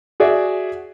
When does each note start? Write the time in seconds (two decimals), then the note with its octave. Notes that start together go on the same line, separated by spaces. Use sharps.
0.20 F#4 G#4 D5 E5